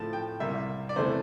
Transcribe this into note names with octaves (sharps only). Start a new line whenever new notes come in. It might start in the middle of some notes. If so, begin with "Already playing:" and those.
Already playing: A2 F3 A3 A5
G5
C2 C3 G3 A#3 E4 E5
D5
E2 C3 E3 A3 C5